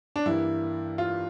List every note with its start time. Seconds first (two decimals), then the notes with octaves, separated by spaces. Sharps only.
0.16 D4
0.26 G2 E3 A#3 E4
0.98 F4